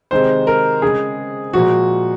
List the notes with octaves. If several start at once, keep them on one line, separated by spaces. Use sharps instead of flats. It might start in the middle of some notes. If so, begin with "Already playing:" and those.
C3 D#3 G#3 C5
A#4
C#3 G#3 G#4
A#2 F3 G#3 F#4